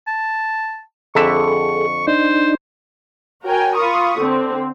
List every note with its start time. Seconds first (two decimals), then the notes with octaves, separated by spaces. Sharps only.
0.07 A5
1.15 F2 D3 G#4 A4 E5 C#6
2.07 D4 D#4 C5
3.43 F#4 A#4 C#5 G5 G#5
3.76 F4 B5 C#6 D#6
4.17 D3 C4